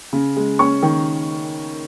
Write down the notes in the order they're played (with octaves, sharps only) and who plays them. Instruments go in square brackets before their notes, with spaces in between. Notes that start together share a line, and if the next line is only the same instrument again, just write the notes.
[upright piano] C#3
G#3
C#4 C#6
D#3